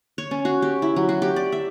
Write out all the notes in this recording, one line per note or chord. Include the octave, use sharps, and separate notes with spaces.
C#5
C#4
F#4
G4
E4
F#3
F#4
G4
D5
E5